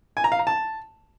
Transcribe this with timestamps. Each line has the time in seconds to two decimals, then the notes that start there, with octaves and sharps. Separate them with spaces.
0.17 G#5
0.24 A#5
0.32 F5
0.39 A#5
0.47 A5